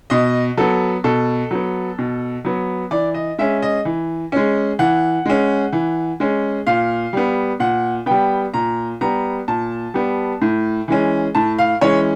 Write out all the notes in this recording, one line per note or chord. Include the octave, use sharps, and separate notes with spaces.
B2 D#5
F#3 B3 A4
B2 A4
F#3 B3
B2
F#3 B3
E3 D5
D#5
G#3 C#4 E5
D#5
E3
G#3 C#4
E3 F#5
G#3 C#4
E3
G#3 C#4
A#2 F5
G3 B3
A#2 F#5
G3 B3 G5
A#2 A#5
G3 B3 A#5
A#2 A5
G3 B3
A2
E3 G#3 C#4
A2 A5
F5
E3 G#3 C#4 C#5